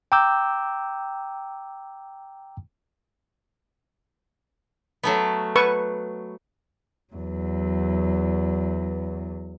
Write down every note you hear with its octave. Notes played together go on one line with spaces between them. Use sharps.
G5 A#5 D6 E6 G6
F#3 A3 B3
B4 C#6
E2 F#3